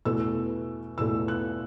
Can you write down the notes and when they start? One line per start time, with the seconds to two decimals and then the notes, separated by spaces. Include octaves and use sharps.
0.05 E2 B2 A3 E6
0.98 E2 B2 A3 E6
1.28 F#6